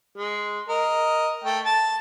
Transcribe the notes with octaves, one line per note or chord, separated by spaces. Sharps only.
G#3
A#4 D#5
A3 G5
A5